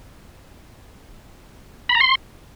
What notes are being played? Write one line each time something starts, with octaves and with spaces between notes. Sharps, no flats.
B5
A#5
C6